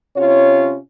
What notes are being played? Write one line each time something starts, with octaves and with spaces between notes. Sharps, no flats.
C3 C#4 F4 C#5